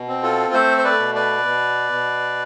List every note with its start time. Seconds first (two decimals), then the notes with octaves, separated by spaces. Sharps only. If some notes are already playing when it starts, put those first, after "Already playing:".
Already playing: B2
0.08 C4
0.23 F4 A4
0.53 A3 A4 C5
0.78 C5
0.84 B4 D5
1.00 B2
1.15 B4 D5
1.46 B2
1.92 B2